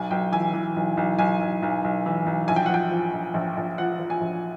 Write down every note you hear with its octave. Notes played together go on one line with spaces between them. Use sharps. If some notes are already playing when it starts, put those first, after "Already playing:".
Already playing: B1 G#5
B1 G5
E3 G#5
E3
B1
B1
B1 G#5
B1
B1
B1
E3
B1
A#1 G#5
G5
F#5
F3 G5
F3
A#1
A#1
A#1
F3 F#5
F3
G#5
A#1